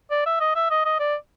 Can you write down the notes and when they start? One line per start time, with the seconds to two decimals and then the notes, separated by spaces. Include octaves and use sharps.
0.11 D5
0.26 E5
0.40 D#5
0.55 E5
0.70 D#5
0.85 D#5
1.00 D5